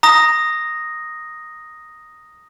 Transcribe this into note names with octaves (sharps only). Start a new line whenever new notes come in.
A#5 D#6 A#6